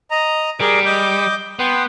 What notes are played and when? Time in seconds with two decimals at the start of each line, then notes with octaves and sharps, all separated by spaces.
0.11 D#5 A#5
0.61 G3 G#4 A#4 D5
0.86 D#5 D6 G6
1.59 B3 G5 C6